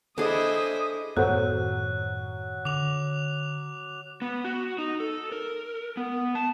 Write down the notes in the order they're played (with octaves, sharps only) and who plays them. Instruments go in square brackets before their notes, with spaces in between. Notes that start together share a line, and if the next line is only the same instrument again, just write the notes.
[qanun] D4 G#4 [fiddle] E4 C5 [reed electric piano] A4 [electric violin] D#5 D#6
[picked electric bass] F#2 A2 D#3 [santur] F#3 [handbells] B3 A4 C5 [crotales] F#6
[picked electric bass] D3 [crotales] D6 F7
[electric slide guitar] B3
F#4
D#4
A4
A#4
B3
A5